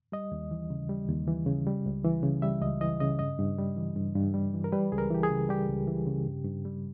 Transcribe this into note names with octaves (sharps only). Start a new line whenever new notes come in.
G3 D#5
D#2
E3
C#3
G3
D#2
E3
C#3
G3
C#2
E3
C#3
G3 E5
C#2 D#5
E3 D#5
C#3 D#5
G2 D#5
G2
G3
E3
G2
G2
G3
E3
A#4
G3 B4
C#2 G#4
A#4
E3 G4
G#4
C#3
G3 G4
C#2
E3
C#3
G2
G2
G3